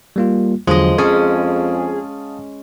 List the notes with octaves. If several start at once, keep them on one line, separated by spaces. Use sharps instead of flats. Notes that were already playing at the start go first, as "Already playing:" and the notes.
G3 A#3 F4
E2 D3 F3 F#3 G#3 D#5
F2 C#4 G#4 F5 A5 D#6